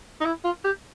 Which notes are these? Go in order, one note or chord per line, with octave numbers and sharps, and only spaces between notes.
D#4
E4
F4
G4